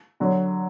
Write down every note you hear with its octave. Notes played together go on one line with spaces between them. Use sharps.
D3 F#3